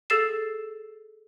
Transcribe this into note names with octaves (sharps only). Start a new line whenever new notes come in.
G#4 A4 E6 A6 C7 E7